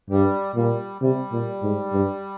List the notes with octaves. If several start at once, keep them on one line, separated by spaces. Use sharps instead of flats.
G2 G3
A#2 G3
C3 G3
A#2
G#2
G2